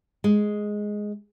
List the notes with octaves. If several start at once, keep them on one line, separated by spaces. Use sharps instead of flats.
G#3